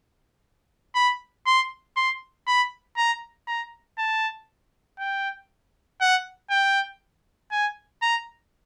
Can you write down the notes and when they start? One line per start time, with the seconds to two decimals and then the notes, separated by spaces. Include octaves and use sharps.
0.95 B5
1.46 C6
1.97 C6
2.47 B5
2.97 A#5
3.47 A#5
3.98 A5
4.99 G5
6.01 F#5
6.50 G5
7.52 G#5
8.02 A#5